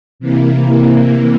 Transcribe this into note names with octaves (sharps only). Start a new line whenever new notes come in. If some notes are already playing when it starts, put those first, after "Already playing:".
C3 E3 A#3